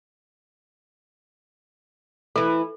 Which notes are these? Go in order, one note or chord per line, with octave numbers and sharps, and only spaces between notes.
E3 E4 A4